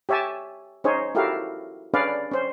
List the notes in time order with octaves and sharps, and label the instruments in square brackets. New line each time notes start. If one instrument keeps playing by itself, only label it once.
[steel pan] G4 C#5 E5 G#5 A5
C#4 D#4 G#4 C5 C#5
E4 F#4 G4 A4 A#4 F5
C#4 D4 G#4 B4 D5 F5
C#4 C5